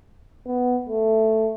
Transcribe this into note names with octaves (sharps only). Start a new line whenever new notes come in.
B3
A3